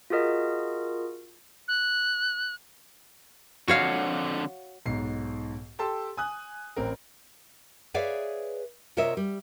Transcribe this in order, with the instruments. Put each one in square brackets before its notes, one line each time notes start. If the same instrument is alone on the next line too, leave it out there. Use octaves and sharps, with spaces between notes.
[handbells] F4 F#4 G#4 A#4 D#5
[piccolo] F#6
[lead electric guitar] F2 D3 [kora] F#4 C#5 F5
[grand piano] B1 G#2 C7
G4 A4 G5 A5 C6 E6
G#5 D#6 F#6
A1 C4 A#4
[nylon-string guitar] G#4 B4 C#5 D5 E5 F5
C3 F4 A#4 C#5 D#5 E5
G3